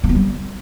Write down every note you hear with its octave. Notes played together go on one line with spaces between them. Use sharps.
A3
B3
G3